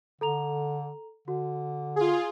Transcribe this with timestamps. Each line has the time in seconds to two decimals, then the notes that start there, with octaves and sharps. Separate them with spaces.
0.21 D3 A4 A#5 F7
1.28 D3 F#4
1.96 F4 G#4